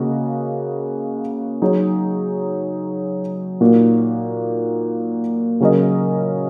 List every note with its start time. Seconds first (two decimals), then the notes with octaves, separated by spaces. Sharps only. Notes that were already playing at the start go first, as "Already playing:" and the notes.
Already playing: C#3 A#3 F#4 D#5
1.62 F#3 D#4 G#4 C#5
3.61 A#2 A#3 D#4 F#4
5.60 C#3 F#3 C#4 A#4 D#5